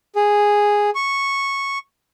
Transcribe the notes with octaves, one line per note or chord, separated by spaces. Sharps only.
G#4
C#6